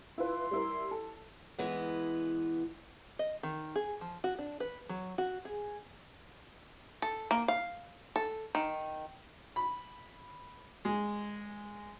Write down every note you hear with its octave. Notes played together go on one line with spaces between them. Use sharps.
E4 F4 B4 C6
G3 E4 A#4
A4
E3 G#3 B3
D#5
D#3
G#4
F3
F#4
D4
B4
F#3
F#4
G#4
A4
A#3
F5
A4
D#3
B5
G#3